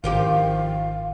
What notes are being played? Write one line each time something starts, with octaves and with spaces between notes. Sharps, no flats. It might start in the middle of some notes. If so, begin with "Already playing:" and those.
G#1 D#3 F3 G4 F5